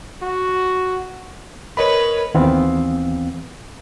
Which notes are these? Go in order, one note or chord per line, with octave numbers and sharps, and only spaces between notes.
F#4
A#4 B4 C#5 D#5 B5
D#2 E3 B3 C4 F5